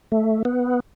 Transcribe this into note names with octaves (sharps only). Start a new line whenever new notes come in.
A3
B3